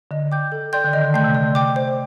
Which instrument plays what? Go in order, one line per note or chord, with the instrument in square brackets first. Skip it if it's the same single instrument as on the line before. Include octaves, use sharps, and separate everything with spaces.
[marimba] D3 [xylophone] D#5
[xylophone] G5 D6 G6
A4
D5 G5 C6 G6
[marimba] D3
[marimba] D#3 [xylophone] D#5
[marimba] D3
[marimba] A3 [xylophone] G5 C6 G6
[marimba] C3
[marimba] D3 [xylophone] D5
[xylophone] G5 D6
C5